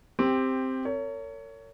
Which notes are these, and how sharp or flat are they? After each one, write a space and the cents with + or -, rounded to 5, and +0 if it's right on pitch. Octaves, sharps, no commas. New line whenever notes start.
C4 +0 G4 +10
A#4 -40 C#5 +20